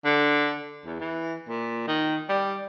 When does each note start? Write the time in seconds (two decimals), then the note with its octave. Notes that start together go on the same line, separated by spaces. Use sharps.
0.05 D3
0.86 E2
1.00 E3
1.49 A#2
1.87 D#3
2.29 G3